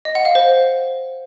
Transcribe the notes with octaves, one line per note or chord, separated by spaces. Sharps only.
D#5
F#5
F5
C5